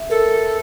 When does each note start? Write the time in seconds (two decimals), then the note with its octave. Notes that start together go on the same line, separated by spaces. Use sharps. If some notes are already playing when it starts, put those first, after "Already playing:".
Already playing: E5
0.10 A4 A#4